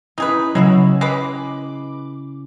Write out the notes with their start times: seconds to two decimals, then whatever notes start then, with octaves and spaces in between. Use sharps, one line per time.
0.18 C#4 D#4 E4 G#4 B4
0.55 C#3 F#3 G#3 E4 F#4
1.01 G#3 B4 D6